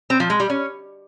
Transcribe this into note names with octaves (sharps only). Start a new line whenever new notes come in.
C4
F3
G#3
G3
C#4